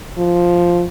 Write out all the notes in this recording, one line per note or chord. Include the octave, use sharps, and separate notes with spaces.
F3